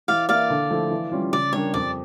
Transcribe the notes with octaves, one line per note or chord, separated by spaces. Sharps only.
E3 D5 F5
A#3 E4 D5 F5
D3
F3 A3 E4
E3
G3 C#4 F4
C#3 D5
G3 D4 G4 A#4 C#5
F2 D5